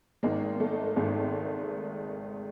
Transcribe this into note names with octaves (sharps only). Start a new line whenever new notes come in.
G#1 G#2 D#3 G#3 A#3
A3
G#1 G#2 D#3 G#3